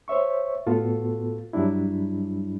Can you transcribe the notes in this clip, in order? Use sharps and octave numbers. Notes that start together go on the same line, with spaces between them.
C5 C#5 E5 C#6
A2 B3 F4 F#4 A4
G2 F#3 G3 D4 E4